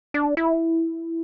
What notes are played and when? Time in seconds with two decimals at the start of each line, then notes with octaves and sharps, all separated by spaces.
0.14 D4
0.37 E4